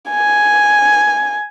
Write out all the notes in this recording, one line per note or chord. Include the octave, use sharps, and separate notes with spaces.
G#5